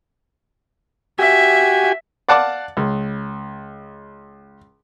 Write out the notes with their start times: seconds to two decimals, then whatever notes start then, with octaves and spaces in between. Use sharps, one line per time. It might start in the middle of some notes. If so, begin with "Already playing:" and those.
1.19 F#4 G4 E5 G#5
2.29 D5 F5 F#5 A5 D6
2.77 C#2